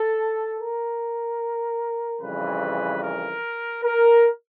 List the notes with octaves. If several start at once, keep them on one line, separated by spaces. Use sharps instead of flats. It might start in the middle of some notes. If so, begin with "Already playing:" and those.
Already playing: A4
A#4
F2 C#3 E3 G3 B4
A#4
A#4